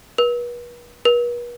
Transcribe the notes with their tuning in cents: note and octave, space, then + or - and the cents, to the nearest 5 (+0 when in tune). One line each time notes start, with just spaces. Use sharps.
B4 -40
B4 -45